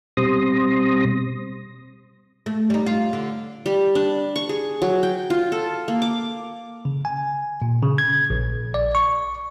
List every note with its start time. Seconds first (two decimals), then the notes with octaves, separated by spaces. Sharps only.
0.17 B2 G3 C4 C6 D#6 A#6
2.46 A3
2.70 G3 D#4
2.86 F4
3.13 D3
3.66 G3
3.95 D4
4.36 C#6
4.49 G#4
4.82 F#3
5.03 G5
5.30 F4
5.52 A4
5.88 A#3
6.02 D6
6.85 C#3
7.05 G#5
7.62 A#2
7.83 C#3
7.98 G#6
8.30 A#1
8.74 D5
8.95 C#6